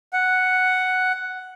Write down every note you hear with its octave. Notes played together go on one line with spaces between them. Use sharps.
F#5